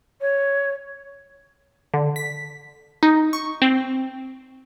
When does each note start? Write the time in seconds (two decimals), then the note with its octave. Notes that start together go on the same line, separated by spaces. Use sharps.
0.21 C#5
1.94 D3
2.16 B6
3.03 D#4
3.33 C#6
3.62 C4